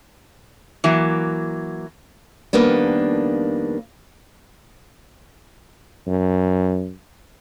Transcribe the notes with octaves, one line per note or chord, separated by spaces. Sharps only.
E3 F#3 A#3
F2 D#3 G3 A#3 B3 D4
F#2